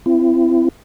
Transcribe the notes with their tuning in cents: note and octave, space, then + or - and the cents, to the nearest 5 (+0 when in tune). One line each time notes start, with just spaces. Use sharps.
C4 -15 E4 +35